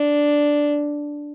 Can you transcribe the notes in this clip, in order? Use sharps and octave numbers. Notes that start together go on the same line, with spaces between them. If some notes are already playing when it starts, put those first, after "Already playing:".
Already playing: D4